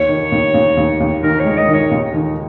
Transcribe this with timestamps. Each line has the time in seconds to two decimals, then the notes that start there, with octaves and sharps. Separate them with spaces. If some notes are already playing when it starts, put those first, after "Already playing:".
Already playing: D#2 C#5
0.09 D#3
0.32 D#2
0.54 D#2
0.77 D#2
1.00 D#2
1.23 D#3 A#4
1.39 C#5
1.45 G#3
1.57 D#5
1.68 D#3
1.74 C#5
1.91 D#2
2.14 D#3